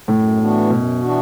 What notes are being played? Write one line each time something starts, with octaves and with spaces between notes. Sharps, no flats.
F#2 A2
E3 B3 D4 F#4
F#2 B2
E3 B3 D4 F#4